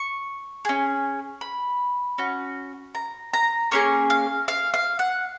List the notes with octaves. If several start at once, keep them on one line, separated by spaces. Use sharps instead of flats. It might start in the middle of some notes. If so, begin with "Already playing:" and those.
Already playing: C#6
C#4 G#4
B5
C#4 F#4
A#5
A#5
A#3 C#4 G#4 C#6
F5
F5
F5
F#5